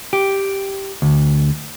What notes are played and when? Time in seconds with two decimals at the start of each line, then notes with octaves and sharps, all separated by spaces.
0.13 G4
1.02 D2